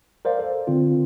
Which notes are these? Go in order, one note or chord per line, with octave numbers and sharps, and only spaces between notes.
A#4 C5 D5 F5
A4
D3 C4 F4